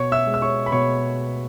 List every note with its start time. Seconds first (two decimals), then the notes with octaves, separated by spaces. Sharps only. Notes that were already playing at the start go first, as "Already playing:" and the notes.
Already playing: B2 C#5 C#6
0.12 E5 E6
0.27 G#3
0.34 E6
0.42 C#5 C#6
0.66 B5
0.72 B2 C#5 C#6